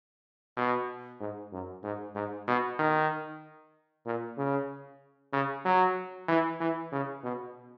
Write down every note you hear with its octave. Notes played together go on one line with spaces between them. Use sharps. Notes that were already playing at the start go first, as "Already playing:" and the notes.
B2
G#2
F#2
G#2
G#2
B2
D#3
A#2
C#3
C#3
F#3
E3
E3
C#3
B2